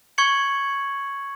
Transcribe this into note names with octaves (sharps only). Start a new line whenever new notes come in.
C#6 G#6 C#7 F#7